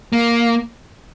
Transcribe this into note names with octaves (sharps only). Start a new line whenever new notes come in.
A#3